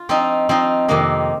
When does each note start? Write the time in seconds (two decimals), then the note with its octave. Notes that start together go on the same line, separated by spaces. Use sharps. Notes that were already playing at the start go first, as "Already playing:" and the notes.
Already playing: F4
0.09 F3 C4 D#4
0.49 F3 C4 D#4
0.88 F2 C3 D#3 A#3 D#4